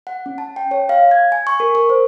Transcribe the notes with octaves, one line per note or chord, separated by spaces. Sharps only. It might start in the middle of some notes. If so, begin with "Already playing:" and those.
F#5
C#4
A5
G5
C#5
F5
G#6
G#5
C#6
A#4
A#4
C5